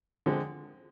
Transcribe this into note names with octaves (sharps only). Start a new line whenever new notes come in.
D3 F3 G#3 C4